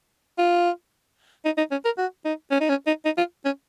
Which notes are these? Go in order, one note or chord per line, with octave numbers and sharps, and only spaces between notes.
F4
D#4
D#4
C#4
A#4
F#4
D#4
C#4
D#4
C#4
D#4
D#4
F4
C#4